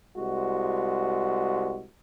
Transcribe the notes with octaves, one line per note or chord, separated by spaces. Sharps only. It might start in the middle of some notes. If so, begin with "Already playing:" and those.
C2 G#3 F#4